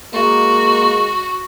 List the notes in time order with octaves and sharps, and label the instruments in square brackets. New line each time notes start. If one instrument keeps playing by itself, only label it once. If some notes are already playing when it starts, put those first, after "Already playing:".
[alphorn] G#3 [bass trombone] A#3 [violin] F#4